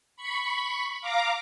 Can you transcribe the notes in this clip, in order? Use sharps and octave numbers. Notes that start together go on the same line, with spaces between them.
B5 C#6
F5 A#5 D6